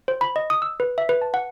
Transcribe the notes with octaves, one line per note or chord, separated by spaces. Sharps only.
C5
B5
D#5
D#6
E6
B4
E5
B4
A5
F#5